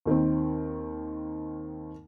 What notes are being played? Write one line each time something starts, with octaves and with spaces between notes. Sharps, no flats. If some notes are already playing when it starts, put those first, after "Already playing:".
D#2 D#3 C4